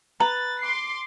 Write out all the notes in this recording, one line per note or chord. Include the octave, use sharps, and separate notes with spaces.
B4 A#5 A6
C6 D6 C7